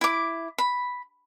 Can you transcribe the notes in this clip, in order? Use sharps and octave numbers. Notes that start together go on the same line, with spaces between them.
E4 D6
B5